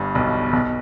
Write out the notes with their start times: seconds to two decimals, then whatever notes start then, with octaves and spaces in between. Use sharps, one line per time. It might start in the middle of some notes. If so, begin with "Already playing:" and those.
Already playing: G1 G2
0.15 B1 B2
0.53 B1 B2